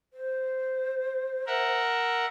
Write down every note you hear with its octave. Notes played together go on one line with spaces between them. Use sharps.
C5
A#4 E5 F#5